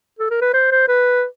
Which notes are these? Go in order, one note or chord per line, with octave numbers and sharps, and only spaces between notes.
A4
A#4
B4
C5
C5
B4